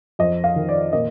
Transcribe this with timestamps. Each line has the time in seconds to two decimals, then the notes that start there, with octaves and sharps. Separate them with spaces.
0.19 F2 D#5
0.44 F5
0.56 D#3
0.69 D5
0.93 A#2 D#5